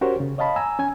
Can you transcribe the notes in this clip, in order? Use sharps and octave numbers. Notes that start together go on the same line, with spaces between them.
C#4 F#4 G4 A#4 C5 C#5
C#3
C#5 D#5 F5 A5 B5
G#5 A#5 E6
C#4 G#5